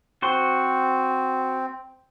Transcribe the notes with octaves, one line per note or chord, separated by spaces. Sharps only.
C4 F#4 C5 C6